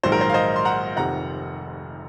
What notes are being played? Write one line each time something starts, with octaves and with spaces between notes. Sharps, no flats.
A#1 G#2 D#3 F#3 C5
A#4
C5
F5
C5 D#5
C6
F#5 A#5
F1 F2 C3 D#3 F#5 A#5